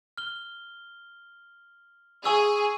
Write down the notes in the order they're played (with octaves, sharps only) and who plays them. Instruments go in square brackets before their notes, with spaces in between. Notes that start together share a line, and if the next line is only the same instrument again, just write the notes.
[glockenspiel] F6 G7
[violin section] G#4 [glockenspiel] G#5 C#6 E6